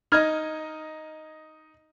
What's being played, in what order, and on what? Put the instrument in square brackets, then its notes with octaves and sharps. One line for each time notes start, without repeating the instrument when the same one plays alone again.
[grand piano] D#4 D#5 [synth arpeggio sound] B5 F6 G#6